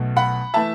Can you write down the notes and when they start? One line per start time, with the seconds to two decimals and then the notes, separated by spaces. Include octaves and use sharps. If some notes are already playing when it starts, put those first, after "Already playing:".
Already playing: B1 B2 A3
0.16 F#5 B5
0.54 E3 A3 E5 A5